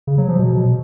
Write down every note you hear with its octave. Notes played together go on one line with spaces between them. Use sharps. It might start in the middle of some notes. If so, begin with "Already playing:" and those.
C#3
F#3
F3
B2